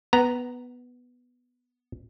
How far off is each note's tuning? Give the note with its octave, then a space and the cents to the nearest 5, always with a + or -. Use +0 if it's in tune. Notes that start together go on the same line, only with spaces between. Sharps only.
B3 +0 F#5 +30 A#5 +0